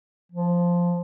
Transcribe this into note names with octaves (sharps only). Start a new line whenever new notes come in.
F3